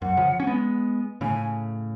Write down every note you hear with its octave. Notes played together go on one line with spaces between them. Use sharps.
F#2 F#5
C#3 F3
C#4
G#3 B3
A2 C#3 G#5